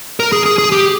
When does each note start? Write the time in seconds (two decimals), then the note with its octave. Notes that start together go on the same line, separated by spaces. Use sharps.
0.20 A#4
0.32 G#4
0.46 G#4
0.58 G#4
0.72 G4